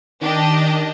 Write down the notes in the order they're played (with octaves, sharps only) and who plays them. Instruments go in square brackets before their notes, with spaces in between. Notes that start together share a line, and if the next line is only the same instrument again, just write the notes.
[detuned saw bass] D#3 [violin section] D4 G4 D#5